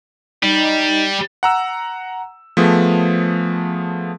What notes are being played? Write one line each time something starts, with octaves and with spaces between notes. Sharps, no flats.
G3 D#4
F#5 A#5 E6
F3 A3 B3 G#4